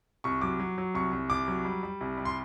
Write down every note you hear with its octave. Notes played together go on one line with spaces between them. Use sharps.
C2 C#6
F#3 D6
F#3
F#3
C2 C#6
C2
C2 D6
F#3
G3
G3
C2
G3
C6